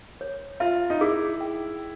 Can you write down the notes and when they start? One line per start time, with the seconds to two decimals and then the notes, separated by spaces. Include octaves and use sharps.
0.21 C#5
0.60 F4 E5
0.90 D#4
1.01 E4 G#4
1.41 G5